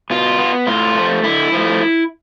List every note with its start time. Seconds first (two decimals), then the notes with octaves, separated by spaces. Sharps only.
0.10 B2 F4
0.39 B3
0.67 A2 F4
0.95 F3 A3
1.24 D3 E4
1.52 F3 A3